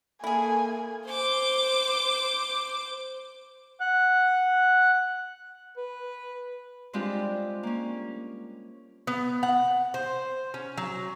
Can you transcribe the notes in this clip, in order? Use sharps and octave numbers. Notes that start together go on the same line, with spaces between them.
A#3 E4 G#4 A4 G#5
C5 D6
F#5 F#6
B4
G3 G#3 C4 D4 F4 G4
A#3 C#4
B3
F#5
C5
C#4
F#3